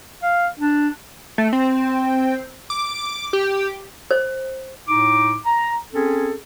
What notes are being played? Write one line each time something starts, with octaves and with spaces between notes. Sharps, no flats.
F5
D4
A3
C4
D6
G4
C5
A2 D#4 D6
A#5
C4 C#4 G#4 A4